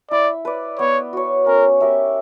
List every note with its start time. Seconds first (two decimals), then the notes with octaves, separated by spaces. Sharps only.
0.11 E4 D5
0.45 B4 D5
0.79 B3 C#5
1.13 F#4 C#5
1.46 C#4 A#4
1.80 G4 A#4 E5